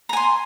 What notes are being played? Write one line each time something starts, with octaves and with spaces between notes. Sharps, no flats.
G#5 A#5 C6